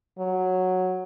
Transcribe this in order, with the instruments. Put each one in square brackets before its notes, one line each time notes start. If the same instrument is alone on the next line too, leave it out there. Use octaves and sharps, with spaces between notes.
[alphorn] F#3